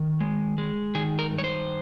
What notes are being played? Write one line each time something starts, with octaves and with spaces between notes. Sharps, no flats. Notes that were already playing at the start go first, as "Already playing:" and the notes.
Already playing: D#3
G#3
G#3
D#3 G#4
A#4
G2
C#5
C5